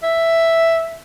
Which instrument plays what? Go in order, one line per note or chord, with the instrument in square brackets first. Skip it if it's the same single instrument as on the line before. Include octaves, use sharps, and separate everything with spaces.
[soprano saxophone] E5